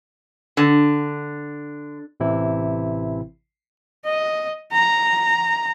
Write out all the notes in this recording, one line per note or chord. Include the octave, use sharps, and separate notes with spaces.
D3
A1 C3 E3 E4
D#5
A#5